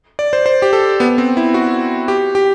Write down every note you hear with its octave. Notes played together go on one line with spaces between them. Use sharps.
D5
C5
C5
G4
A4
B3
C4
E4
F#4
G4
G4